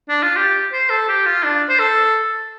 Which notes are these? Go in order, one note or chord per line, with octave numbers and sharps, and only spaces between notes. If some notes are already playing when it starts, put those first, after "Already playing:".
D4
F4
G4
C5
A4
G4
F4
D4
C5
A4